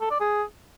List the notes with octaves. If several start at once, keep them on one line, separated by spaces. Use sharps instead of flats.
A4
D5
G#4